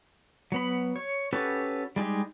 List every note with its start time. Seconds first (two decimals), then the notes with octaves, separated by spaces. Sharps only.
0.52 F#3 B3 B5
0.96 C#5
1.33 C#4 F#4 G4 A4 B4
1.96 G3 G#3 D#4 G4